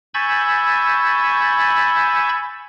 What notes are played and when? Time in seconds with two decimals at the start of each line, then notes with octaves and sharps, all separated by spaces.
0.14 G#5 B5 C#6 E6 G6 A6